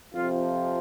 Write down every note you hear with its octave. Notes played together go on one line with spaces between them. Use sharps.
F2 C3 F3 F4